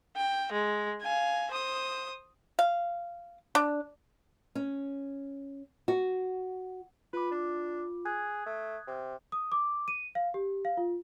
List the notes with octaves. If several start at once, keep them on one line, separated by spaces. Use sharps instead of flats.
G5
G#3
F5 G#5
C5 D#6
F5
D4
C#4
F#4
F4 B4 D6
D4
G#4 D#6 F#6 G#6
A3
C3
D#6
D6
D#7
F5
G4
F5
F4